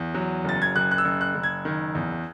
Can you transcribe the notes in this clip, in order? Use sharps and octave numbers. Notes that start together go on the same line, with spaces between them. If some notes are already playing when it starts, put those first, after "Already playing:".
Already playing: E2
F#3
F#1 A6
G#6
F#1 F#6
F#6
E6
F#1
F#6
F#1
G#6
D#3
E2